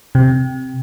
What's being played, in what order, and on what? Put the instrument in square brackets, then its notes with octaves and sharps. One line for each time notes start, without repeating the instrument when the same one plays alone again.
[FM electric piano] C3